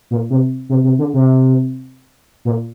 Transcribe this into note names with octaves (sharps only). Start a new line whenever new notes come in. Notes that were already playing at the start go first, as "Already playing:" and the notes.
A#2
C3
C3
C3
D3
C3
A#2